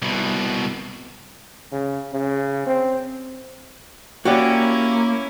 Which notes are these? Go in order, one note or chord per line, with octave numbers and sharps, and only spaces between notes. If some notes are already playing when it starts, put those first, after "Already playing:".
C2 B2
C#3
C#3
C4
A#3 C#4 E4 F#4 G4 D5